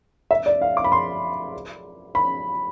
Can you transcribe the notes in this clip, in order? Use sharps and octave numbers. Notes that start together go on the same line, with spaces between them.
E5
D5
F5
D6
B5
C6
B5